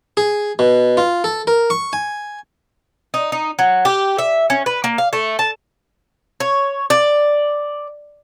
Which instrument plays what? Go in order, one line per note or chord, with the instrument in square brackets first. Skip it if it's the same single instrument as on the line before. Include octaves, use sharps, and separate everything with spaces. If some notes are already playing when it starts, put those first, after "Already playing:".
[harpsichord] G#4
B2
F4
A4
A#4
C#6
G#5
[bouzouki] D#4
D#4
F#3
G4
E5
C#4
B4
A#3
F5
A3
A5
C#5
D5